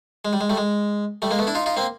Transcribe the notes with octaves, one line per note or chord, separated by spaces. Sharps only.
G#3
G3
G#3
G3 A3
G#3
G3 A3
G#3 A#3
A3 B3
D4 E4
D#4 F4
D#4 F4
A#3 C4